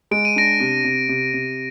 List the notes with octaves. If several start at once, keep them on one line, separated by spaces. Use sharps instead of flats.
G#3 D7
D#7
D4 A#6 D7
C3
C3
C3
C3